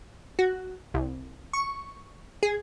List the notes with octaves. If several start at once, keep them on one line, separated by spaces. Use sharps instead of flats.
F#4
C2
C#6
G#4